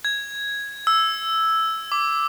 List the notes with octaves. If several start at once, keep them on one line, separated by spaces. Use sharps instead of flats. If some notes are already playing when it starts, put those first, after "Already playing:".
G#6
E6
D6